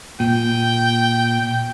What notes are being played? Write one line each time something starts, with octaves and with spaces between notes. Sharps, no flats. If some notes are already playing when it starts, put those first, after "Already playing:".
A#2 G5